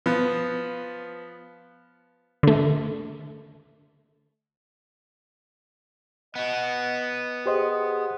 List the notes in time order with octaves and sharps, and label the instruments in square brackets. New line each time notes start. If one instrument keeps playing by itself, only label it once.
[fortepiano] F3 B3
[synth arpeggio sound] D3 A3
[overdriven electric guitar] B3 F#4 [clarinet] D#5
[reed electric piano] G4 C5 D#5 [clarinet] G#4